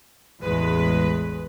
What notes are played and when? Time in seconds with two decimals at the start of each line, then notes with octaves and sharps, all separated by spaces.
0.43 A1 E2 G#3 B4